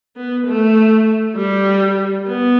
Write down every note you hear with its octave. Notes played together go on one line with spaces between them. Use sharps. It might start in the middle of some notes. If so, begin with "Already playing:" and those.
B3
A3
G3
B3